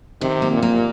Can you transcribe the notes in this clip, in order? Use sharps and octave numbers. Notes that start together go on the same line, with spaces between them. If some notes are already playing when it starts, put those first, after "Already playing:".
C3 D#3
A#3
A#2
A#3